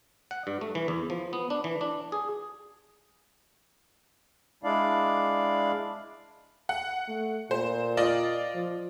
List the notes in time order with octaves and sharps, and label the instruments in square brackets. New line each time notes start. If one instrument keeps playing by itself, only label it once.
[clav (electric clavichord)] F#5
G2
A3
E3
E2
F3
B3
D4
E3
D4
G#4
[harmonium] G#3 D4 E4 D5 F5
[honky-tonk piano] F#5
[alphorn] A3
[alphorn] A#2 [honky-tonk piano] C5
[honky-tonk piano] F4 D5 D#5
[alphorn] F3